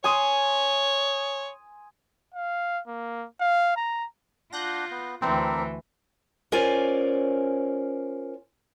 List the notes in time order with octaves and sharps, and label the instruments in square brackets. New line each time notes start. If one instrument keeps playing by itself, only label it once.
[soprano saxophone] C#5 [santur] G#5 C6 D#6
[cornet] F5
A#3
F5
A#5
[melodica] D4 F#5 [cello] F4 [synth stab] F#6 G6 A#6
[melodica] B3
[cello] D2 E3 [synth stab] C4 [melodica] D4 A#4 E5
[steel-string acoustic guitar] C#4 F4 A#4 C5 D5 G#5